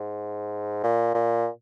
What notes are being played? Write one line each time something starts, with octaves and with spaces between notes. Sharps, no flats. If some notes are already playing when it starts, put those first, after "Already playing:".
Already playing: G#2
A#2
A#2